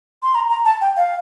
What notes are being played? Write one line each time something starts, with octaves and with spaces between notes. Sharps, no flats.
C6
A#5
A#5
A5
G5
F5